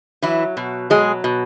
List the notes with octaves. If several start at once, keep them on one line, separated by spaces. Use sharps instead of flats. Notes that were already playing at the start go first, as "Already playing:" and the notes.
E3 F#3 E4
B2
F#3 G#3 G#4
B2